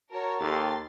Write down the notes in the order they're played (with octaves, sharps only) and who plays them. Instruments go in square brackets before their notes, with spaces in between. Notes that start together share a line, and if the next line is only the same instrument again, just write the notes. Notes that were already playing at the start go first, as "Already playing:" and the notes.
[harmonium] F#4 A5 [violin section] A#4 C#5
[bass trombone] D#2 [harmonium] G4 A4 [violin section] C6 A6